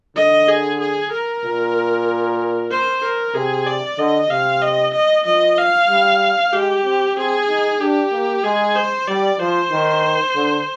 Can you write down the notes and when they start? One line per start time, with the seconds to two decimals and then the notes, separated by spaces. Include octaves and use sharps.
0.16 D3 D#5
0.48 G#4
0.80 G#4
1.11 A#4
1.44 A#2
2.71 C5
3.02 A#4
3.34 C3 G#4
3.66 D5
3.98 D3 D#5
4.30 C3 F5
4.62 D#5
4.94 D#5
5.26 F3 D#5
5.57 F5
5.89 G3
6.53 G#3 G4
6.85 C4
7.16 C4 G#4
7.48 D#4
7.80 D4 G4
8.12 A#3
8.44 G#3 G#4
8.76 C5
9.07 G3 D5
9.39 F3 C5
9.71 D#3
10.35 D3